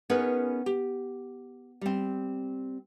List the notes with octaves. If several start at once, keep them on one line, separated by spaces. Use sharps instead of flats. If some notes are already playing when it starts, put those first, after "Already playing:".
B3 C#4 D#4 G#4 A#4 B4
G4
G3 C4